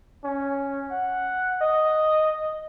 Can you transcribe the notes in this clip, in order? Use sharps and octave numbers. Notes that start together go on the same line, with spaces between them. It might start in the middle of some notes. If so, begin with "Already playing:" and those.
C#4
F#5
D#5